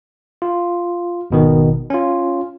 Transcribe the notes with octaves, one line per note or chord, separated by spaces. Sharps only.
F4
G#1 B2 D#3
C#4 F4